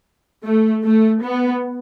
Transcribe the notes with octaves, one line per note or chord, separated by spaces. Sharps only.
A3
A3
B3